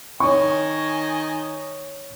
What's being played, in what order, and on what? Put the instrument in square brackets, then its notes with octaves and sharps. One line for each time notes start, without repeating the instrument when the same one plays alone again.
[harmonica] D#3 D#5 G#5 [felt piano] C#5 C#6